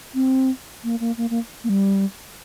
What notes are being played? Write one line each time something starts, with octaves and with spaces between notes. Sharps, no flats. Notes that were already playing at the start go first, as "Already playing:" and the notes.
C4
A#3
A#3
A#3
A#3
A#3
G3